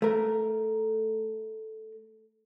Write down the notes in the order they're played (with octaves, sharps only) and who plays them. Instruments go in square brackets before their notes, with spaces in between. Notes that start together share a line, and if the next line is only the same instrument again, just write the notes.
[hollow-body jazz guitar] A3 A#4